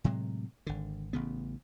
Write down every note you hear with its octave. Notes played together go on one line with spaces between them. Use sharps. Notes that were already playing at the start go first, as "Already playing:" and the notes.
A2 C3 F#3 G#3
G#1 D3
A1 C#3 B3